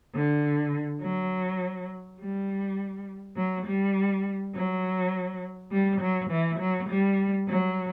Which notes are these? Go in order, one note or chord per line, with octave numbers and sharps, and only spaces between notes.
D3
F#3
G3
F#3
G3
F#3
G3
F#3
E3
F#3
G3
F#3